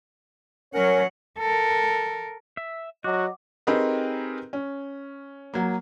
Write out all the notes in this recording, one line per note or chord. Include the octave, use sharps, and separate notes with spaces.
F#3 C#4 A#4 C#5 F#5
A4 A#4
E5
F#3 F#4 D#5 F#5 D6
C4 D#4 G4 G#4 A#4 B4
C#4
F#3 A#3